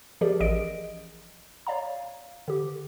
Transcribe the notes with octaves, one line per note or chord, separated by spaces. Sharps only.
F3 G4 G#4 A#4 D5
A1 G#4 D#5 D7
C#5 D5 F5 A#5
D3 G4